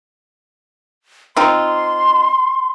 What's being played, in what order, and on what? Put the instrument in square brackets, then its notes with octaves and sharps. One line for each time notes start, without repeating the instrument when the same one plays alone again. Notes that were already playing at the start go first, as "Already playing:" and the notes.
[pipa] C4 D#4 F4 [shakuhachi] C6